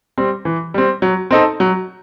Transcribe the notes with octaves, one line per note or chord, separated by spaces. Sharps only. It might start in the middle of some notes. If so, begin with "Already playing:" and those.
G3 C4
E3
G3 C4
F#3
C4 D#4 A4
F#3